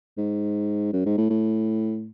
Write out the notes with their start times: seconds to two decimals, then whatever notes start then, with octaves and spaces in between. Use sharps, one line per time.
0.17 G#2
0.93 F#2
1.06 G#2
1.18 A2
1.30 A2